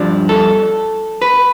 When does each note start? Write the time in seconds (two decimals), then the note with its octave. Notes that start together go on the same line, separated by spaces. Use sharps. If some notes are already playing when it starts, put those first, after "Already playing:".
Already playing: G2 F3 D4
0.29 A4
1.22 B4